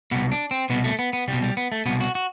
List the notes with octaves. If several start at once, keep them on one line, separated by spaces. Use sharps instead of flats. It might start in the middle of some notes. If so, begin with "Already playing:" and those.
C2 B2 B3
D4
C4
C2 B2 B3
A3
B3
B3
C2 G3
B2
G3
B3
A3
C2 B2 B3
F#4
F#4